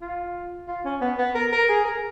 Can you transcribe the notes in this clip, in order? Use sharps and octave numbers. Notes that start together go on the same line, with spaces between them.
F4
F4
C#4
B3
B3
A#4
A#4
G#4
A#4